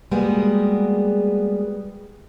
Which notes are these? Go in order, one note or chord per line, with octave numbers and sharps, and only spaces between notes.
G3 G#3 A#3 B3 F#4 G#4